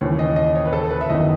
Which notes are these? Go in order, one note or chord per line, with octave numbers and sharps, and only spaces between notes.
D#2 C#3 E3 C#5
D#5
D#5
C#5
B4
A4
B4
E5
F#1 E2 D#3 D#5